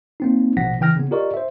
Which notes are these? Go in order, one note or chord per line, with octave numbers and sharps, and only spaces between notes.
A#3 C4 D#4
A#1 B2 F3 F#5 A#6 B6
C#3 E3 G5 F6 A#6
C#3 B3
F4 G4 A#4 D5 D#5 C#6
C5 E5